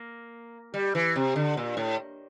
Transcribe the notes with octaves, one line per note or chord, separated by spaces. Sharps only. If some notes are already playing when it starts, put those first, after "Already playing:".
Already playing: A#3
G3
E3
C3
D3
A#2
A2